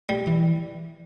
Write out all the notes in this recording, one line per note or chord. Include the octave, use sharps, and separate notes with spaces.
G3
E3